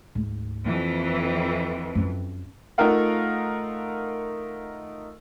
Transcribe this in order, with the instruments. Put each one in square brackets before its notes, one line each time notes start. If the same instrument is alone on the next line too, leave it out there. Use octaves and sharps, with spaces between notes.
[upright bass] D2 G#2
[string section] F2 E3 [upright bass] A#3
[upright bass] F#2
[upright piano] A3 D#4 F4 A#4 F5 F#5